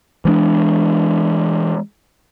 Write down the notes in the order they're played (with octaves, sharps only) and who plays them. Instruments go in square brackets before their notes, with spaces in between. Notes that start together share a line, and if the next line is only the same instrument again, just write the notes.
[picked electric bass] E3 G#3 D4